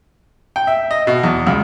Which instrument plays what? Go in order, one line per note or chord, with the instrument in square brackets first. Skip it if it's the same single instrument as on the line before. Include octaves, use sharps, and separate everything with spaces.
[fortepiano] G5
E5
D#5
B2
E2
C#2